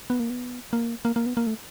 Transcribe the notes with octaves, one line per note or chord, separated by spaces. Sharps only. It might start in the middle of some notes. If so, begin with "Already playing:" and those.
B3
A#3
B3
A#3
A#3
A#3
B3
A#3
A3